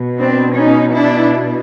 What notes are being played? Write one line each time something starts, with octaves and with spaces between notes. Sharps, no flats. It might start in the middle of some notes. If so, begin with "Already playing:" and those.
Already playing: B2
C4 D4
C#4 D#4
D4 E4